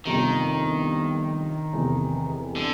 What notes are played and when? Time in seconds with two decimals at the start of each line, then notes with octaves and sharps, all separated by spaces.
0.05 G1 F2 C3 D#3 F3
1.73 F1 E2 C3
2.56 D3